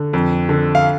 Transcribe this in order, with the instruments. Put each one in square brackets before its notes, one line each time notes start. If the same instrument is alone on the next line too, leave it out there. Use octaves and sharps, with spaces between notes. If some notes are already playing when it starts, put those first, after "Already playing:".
Already playing: [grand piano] D3
F2
D3
F5